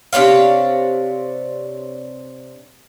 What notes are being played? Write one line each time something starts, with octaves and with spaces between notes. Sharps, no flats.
C3 D4 C#5 F5